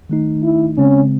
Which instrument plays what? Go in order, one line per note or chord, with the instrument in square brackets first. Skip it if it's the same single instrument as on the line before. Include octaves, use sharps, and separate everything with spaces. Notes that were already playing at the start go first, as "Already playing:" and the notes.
[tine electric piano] D#3 A3 D#4
[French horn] E4
[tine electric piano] C#3 G#3 C4 [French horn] C#4